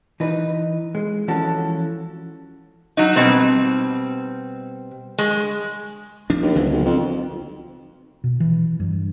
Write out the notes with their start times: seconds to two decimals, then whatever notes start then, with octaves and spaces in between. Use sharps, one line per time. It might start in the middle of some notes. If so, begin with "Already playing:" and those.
0.20 E3 D#4 B4
0.95 G#3
1.28 E3 F3 C#4 F#4 A4
2.97 F#3 D#4
3.16 B2 G3 C4
5.18 G#3
6.30 F3 D4
6.42 D#2
6.55 D#1 C#2 D3 F#3
6.72 B1
6.86 F2
8.24 B2
8.40 E3
8.80 G2